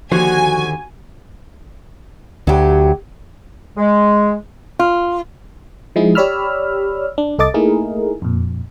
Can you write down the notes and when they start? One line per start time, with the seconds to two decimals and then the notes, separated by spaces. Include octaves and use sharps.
0.12 D#2 D3 F3 F#4 C5 G#5
2.47 D2 F#3 G4
3.77 G#3
4.79 F4
5.96 F3 G#3 D#4 E4 G#4
6.15 G4 C#5 D5 B5 E6 F6
7.18 D4
7.39 C2 A4 D#5 D6 A6
7.54 A3 A#3 D#4 E4 G#4 A#4
8.22 F2 A#2